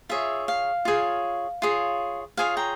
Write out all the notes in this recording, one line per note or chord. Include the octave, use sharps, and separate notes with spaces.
F4 G#4 C#5 E5
F5
F4 G#4 C#5
F4 G#4 C#5
F4 G#4 C#5 F5 G#5
G5 A#5